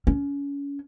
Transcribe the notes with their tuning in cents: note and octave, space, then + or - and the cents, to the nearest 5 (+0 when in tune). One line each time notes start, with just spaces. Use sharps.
C#4 +30